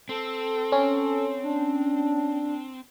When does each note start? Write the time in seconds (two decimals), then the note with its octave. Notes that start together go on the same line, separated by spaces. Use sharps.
0.09 C4 A4
0.72 C#4
1.43 D4